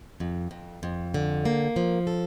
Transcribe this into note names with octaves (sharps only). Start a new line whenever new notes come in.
F2
F2
F2
D3
A#3
F3
A4